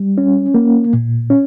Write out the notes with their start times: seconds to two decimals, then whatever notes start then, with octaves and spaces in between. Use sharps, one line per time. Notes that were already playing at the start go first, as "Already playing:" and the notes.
Already playing: G3
0.18 C#4
0.54 A#3
0.93 A#2
1.30 C#4